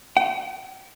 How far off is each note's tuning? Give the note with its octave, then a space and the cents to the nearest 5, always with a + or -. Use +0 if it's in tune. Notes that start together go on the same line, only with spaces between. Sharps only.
G5 -45